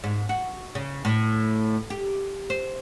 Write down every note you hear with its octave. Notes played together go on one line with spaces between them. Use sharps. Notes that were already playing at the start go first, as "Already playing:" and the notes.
G#2
F#4
C#3
A2
G4
C5